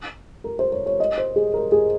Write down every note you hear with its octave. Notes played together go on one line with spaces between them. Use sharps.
A#4
C5
C#5
C#5
D#5
C5
G#4
A#4
G#4